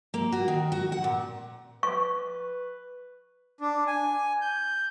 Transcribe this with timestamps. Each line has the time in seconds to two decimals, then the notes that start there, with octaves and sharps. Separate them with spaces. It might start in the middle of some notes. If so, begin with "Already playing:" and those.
0.14 A#3
0.32 F#4
0.48 D#3
0.72 F#4
0.92 F#5
1.04 A#2
1.83 B4 C#6
3.61 D4
3.87 G#5
4.41 G6